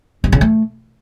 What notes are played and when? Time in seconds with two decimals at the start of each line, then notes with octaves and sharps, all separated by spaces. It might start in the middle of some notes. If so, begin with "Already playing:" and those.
0.24 G2
0.32 C#3
0.41 A3